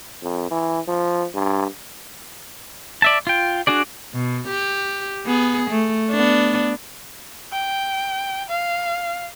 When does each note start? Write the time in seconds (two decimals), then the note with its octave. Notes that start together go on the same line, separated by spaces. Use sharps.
0.23 F2
0.51 E3
0.88 F3
1.35 G2
3.02 D5 E5 A5
3.27 F4 G5
3.67 D4 F#4 G#4 D5
4.14 B2
4.48 G4
5.26 B3 G#4
5.70 A3
6.10 B3 D4
7.52 G5
8.49 F5